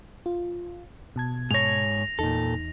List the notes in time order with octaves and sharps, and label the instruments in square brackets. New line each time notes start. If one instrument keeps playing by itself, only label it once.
[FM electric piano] F4
B2 A5 G#6
[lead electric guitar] G#2 C#5 [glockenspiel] A#6 F7
[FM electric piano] E2 D#4 [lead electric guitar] A#2 A4